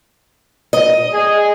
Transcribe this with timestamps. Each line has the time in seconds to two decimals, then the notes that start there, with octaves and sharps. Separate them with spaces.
0.73 D#5
1.13 G#4